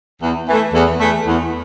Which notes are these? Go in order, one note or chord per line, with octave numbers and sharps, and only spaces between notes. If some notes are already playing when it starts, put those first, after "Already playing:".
E2
E3 A3
E2
E3 A3
E2